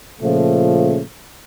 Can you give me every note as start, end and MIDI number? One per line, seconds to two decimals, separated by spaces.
0.22 1.01 46
0.22 1.01 49
0.22 1.01 53
0.22 1.01 57